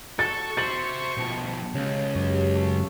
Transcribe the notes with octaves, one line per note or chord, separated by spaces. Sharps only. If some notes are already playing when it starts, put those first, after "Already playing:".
F#4 A4 C#6 A6
C5 E5 A6 F#7
B2 F3 G5 A5 B5
C#2 C#3
F#2 G4 C#5
A3